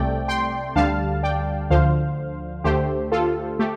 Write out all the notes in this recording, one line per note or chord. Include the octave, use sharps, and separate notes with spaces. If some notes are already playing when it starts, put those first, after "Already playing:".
Already playing: C2 C3 A3 D5 G5
G5 C6
D2 D3 G3 F5 A5
D5 G5
D2 D3 F3 C5 F5
D2 D3 A3 G4 C5
F4 A4
A3 G4